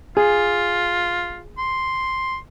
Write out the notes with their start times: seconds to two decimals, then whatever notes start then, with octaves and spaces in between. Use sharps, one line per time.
0.17 F4 G#4
1.59 C6